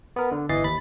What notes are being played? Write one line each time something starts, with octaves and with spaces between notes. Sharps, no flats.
B3 A#4
D3
G1 E3 D#5 A6 C7
D#2 B5 A6 B6